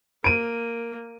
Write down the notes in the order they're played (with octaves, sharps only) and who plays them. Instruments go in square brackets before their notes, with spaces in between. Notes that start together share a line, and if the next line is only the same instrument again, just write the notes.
[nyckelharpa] A#3 [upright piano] D7 D#7